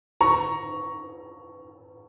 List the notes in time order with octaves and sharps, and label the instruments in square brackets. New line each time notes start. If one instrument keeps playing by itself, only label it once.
[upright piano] A#5 C#6